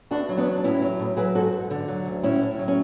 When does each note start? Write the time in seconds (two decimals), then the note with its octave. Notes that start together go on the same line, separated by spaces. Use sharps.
0.11 E2 D4 F#4
0.29 F#3
0.38 B3 D4
0.47 E2
0.58 D4
0.64 A2 C#4 E4
0.82 F#3
1.00 A2
1.17 F#3 G#4 B4
1.35 G#2 F#4 A4
1.53 G#2
1.70 D3
1.88 F#3
2.06 D2
2.23 A2 C#4 E4
2.41 A2
2.59 F#3
2.68 C#4